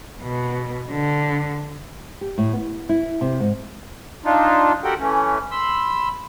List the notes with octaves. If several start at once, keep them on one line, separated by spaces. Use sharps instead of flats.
B2
D3
G4
A2
B3
E4
C3
G#2
D4 D#4 F4
F#4 G4 A4 A#4 F#5 G5
E3 A3 C#4
B5 C6 E6